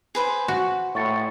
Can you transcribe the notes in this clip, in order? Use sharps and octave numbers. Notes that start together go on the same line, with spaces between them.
G#4 B4 C5
F#4
A2 C#6 A6 C#7